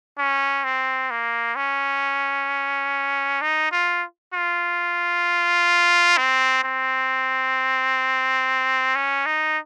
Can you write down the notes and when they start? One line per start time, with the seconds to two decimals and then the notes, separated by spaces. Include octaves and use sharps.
0.18 C#4
0.65 C4
1.11 A#3
1.56 C#4
3.42 D#4
3.72 F4
4.34 F4
6.18 C4
6.64 C4
8.95 C#4
9.26 D#4